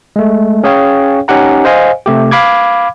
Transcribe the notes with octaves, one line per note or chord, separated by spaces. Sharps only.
G#3 A3
C#4 G#4 C#5 F5 G5
C#4 D#4 G4 F#5 A#5
C5 D#5 F5 G#5
C3 A3 G4
F5 B5 D6 G#6